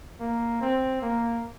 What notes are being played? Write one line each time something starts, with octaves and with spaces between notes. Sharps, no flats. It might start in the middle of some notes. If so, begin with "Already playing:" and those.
A#3
C4
A#3